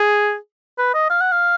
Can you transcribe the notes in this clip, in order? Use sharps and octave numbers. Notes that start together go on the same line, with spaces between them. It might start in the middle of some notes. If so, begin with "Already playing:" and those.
Already playing: G#4
B4
D#5
F5
F#5
F5